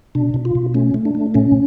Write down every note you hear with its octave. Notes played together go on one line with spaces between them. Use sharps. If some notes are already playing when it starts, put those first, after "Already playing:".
B2 D4
B2
F4
B2
A3 C#4
A3
D4
A3
A#2 C#4